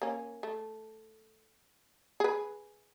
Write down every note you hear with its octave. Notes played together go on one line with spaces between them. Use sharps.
A#3 C#4
A3
G#4 B4